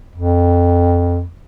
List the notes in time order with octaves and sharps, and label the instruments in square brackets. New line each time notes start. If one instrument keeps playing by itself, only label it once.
[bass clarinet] F2